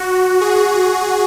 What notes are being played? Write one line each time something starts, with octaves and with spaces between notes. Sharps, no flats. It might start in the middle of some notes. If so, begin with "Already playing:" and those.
Already playing: F#4
G#4